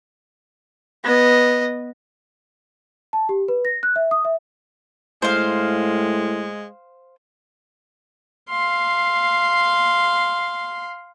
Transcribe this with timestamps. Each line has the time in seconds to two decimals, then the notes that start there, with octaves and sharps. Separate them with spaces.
1.03 B3 D#5
3.13 A5
3.29 G4
3.48 B4
3.65 A#6
3.83 F#6
3.96 E5
4.11 D#6
4.25 E5
5.22 A2 G#3 C5 F5
8.50 F5 C6